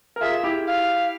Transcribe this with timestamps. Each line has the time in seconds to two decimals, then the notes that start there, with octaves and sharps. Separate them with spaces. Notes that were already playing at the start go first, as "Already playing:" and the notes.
0.16 A#4
0.21 F4 G#4 E5
0.43 E4 G4
0.67 F5